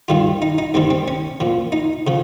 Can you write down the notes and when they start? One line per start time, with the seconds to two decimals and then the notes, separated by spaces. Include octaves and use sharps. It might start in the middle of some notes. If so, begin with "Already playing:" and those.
0.08 G2 D#3 G3 F4
0.42 D#4
0.58 D#4
0.74 G2 D#3 G3 C4
0.90 C4
1.08 C#4
1.40 A#2 F3
1.72 D#4
2.07 C#3 F3